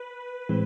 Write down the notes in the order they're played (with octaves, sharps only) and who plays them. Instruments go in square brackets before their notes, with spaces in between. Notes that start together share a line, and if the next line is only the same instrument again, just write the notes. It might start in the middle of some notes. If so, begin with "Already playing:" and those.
Already playing: [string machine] B4
[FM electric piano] A2 E3 G#3 C4